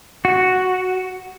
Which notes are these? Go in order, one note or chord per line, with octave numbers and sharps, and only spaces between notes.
F#4